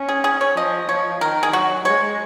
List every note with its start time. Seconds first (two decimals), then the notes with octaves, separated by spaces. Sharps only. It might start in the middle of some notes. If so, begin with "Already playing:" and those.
Already playing: C#4
0.09 G#4
0.24 G#4
0.41 C#5
0.56 F3 D#5
0.89 F3 C#5
1.21 D#3 A#4
1.43 G#4
1.53 F#3 F#4
1.85 G#3 C#5